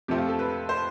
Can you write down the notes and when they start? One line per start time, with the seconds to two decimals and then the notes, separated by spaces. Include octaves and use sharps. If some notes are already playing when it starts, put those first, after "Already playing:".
0.08 F2 C3 F3 A3 C4 G4
0.18 F4
0.29 A4
0.39 B4
0.69 C5